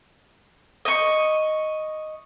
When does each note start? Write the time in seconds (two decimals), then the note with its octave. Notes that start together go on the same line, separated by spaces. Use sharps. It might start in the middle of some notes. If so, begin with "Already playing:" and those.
0.85 D#5 C#6